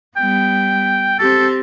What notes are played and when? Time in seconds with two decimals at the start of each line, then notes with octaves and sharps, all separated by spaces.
0.17 G3 B3 G5
1.19 C4 G4 A4